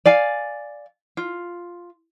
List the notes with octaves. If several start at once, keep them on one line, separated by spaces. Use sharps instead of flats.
D5 F5 G#5
F4